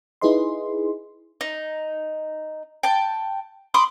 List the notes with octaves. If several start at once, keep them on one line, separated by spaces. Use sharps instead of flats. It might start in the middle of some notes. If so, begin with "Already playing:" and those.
D#4 E4 G#4 B4 D#5 C6
D#4
G5 A5
B5 C6 D6 D#6